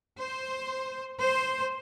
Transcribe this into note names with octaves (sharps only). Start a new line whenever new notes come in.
C5
C5